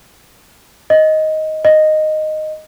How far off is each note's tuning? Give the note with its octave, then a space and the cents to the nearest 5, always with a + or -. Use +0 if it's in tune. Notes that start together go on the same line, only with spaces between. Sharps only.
D#5 +10
D#5 -5